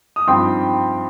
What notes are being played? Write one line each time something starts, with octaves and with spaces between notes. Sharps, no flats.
D#6
G2 F3 C4 D#4 G5 C6